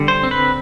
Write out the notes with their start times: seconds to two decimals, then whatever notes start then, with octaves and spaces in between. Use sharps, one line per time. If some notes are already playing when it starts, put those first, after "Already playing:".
Already playing: D3 G3
0.08 C5
0.23 C4
0.31 B4